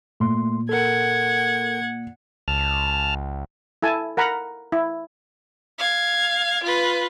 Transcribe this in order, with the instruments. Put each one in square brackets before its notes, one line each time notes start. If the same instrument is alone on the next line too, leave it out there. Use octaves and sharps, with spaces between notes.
[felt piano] A#2 [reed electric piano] A3 C6
[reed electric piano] A4 A#4 [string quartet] F#5 G#6
[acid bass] C#2 [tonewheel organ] A5 F6
[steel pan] E4 A4 G#5 A5
A#4 F#5 A#5 B5
E4
[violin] F5 G#6
F4 B4